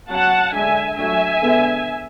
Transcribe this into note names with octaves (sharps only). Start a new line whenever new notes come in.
F#3 C#4 F#5 A5
D3 G#3 D4 E5 G#5
F#3 A3 D4 E5 G#5
D3 G#3 B3 D4